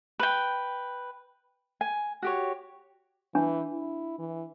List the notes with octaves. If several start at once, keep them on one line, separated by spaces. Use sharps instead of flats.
B4 G5
G#5
F#4 G4 C#5
E3 D4
E4
E3